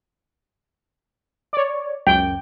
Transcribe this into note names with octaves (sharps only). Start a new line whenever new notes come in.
C#5 D5
C#2 F#2 G5